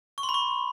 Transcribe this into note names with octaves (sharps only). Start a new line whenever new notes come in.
C#6
C6
B5
C#6